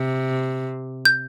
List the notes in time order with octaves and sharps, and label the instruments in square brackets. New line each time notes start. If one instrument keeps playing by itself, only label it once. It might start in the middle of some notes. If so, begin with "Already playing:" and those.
Already playing: [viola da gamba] C3
[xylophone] G6